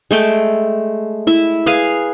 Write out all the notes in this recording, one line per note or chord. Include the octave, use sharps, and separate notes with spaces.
G#3 A3 G5
E4 E5
G#4 B4 F5 G#5